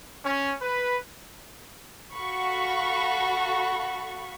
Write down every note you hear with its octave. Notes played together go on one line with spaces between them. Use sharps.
C#4
B4
F#4 A4 F5 B5 C#6